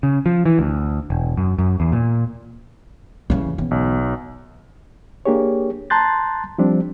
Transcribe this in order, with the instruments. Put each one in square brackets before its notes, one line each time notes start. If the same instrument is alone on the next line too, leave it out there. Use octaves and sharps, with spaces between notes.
[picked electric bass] C#3
F3
E3
D2
E1
F#2
F#2
E2
A#2
[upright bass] C#3 E3 [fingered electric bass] G3 A#3
[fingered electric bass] F1 F#2
[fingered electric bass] G#1 E3 B3 [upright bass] C#3
[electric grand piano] B1
[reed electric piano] A#3 D4 G4 G#4 C#5
A5 A#5 C6 F#6 G6 A6
F3 G3 C4 D4